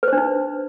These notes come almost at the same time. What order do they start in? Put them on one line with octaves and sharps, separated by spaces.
B4 C5 D4 D#4